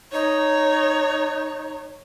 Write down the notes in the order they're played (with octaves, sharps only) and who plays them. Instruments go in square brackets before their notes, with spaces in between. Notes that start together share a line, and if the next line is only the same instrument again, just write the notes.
[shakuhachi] D#4 [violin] C#5